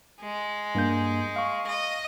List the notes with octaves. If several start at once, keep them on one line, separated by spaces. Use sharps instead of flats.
G#3
G2 A#3 G6
F5 C#6
D#5